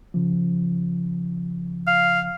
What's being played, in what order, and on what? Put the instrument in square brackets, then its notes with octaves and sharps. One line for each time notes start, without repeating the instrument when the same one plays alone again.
[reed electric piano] C#3 F3
[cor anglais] F5